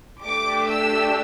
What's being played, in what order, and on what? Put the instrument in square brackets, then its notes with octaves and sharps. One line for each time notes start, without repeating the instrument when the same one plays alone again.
[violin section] A3 D4 G4 D6
E6